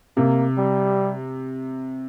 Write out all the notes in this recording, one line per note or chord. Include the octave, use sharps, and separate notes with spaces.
C3 A#3
G3